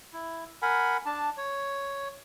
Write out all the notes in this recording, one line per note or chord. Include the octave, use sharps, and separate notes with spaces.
E4
A#4 F#5 G#5 B5
D4 A5
C#5